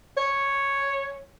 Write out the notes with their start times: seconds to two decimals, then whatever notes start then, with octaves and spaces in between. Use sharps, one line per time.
0.17 C#5